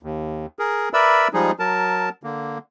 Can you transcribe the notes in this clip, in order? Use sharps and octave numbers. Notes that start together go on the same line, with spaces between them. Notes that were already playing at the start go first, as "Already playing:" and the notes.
D#2
G#4 A#4
A#4 B4 D5 E5 B5 E6
F3 G3 G#3 D#4 G#4
F#3 A#4 A5
D3 A#3